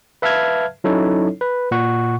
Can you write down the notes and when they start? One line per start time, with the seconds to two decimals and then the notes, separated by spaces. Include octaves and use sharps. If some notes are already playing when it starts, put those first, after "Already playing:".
0.22 B4 E5 F5 A5 F6 G#6
0.84 F#3 C#4 D#4 E4 A4 C#5
1.41 B4
1.71 A#2 F#5 C#6